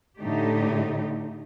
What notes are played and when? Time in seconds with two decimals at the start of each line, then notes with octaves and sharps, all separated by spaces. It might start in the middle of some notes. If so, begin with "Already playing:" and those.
0.18 A2 D3 A3 D#4 G4